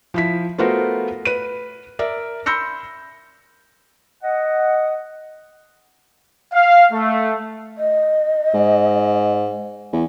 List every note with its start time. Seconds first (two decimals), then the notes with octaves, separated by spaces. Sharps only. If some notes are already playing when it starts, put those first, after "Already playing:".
0.14 F3 E4 B6
0.58 A3 B3 F4 F#4 A#4 C5
1.25 B4 D#7
1.99 A#4 D5 E5
2.46 B5 C6 E6 G6 A#6 C#7
4.23 D#5 F#5
6.53 F5
6.92 A3
7.78 D#5
8.54 G#2
9.92 E2